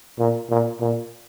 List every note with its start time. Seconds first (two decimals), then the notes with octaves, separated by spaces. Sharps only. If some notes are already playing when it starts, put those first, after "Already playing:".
0.18 A#2
0.50 A#2
0.81 A#2